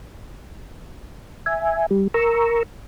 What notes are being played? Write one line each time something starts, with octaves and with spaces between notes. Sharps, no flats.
E5 G#5
G3
A#4 A#5 C#6 E6